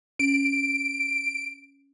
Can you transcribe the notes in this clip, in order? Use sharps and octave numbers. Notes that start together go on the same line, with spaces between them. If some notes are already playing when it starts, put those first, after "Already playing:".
C#4 D7